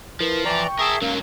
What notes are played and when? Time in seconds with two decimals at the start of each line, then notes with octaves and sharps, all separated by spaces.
0.20 F3 E4 A#4 B4
0.45 E3 D5 G5 A#5 C#6
0.79 G#4 A#4 E5 A5
1.02 G#2 F#3 A#3 C#4 A#4